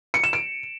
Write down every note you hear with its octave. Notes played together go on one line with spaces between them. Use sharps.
C#7
E7
D7